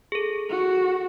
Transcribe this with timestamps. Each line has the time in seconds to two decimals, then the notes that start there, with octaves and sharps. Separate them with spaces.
0.12 G#4 A4
0.49 F#4